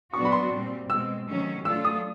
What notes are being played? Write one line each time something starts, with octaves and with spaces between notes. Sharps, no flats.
A#2 F#3 B3 D4 F#4 C#6
B5
C6
A#2 G3 C4
B2 G#3 C4 E6
C3 D#3 F#3 A3 C#4
F#3 A3 D4 F4 A4 E6
D#6